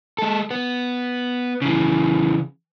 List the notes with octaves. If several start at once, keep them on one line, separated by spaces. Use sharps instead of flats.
G#3 A4
B3
C#3 E3